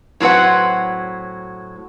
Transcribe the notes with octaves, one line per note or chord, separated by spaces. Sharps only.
A2 F#3 C4 B4 F#5